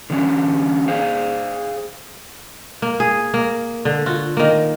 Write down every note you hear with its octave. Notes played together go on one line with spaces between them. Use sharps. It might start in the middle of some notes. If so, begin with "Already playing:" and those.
D3 E3 F#3 A#3 C#4 D4
G#4 C5 F5
A#3
G#4
A#3
D3
F4 F#4
D#3 A#3